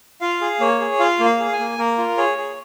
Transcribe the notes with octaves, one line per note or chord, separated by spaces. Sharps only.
F4 F5
G#4
A#3 C#5
G#4
F4 F5
A#3
F5
G#4
G#5
A#3
A#3 A#4
F4
G#4 C#5
G#4